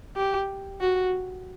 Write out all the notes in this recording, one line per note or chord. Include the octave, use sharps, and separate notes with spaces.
G4
F#4